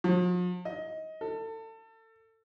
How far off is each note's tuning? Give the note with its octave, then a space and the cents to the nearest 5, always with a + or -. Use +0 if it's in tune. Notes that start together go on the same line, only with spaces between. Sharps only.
F3 +45
D#5 +20
A4 +30